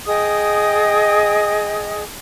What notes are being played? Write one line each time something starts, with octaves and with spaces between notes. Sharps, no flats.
G#4 D#5 G5 D#6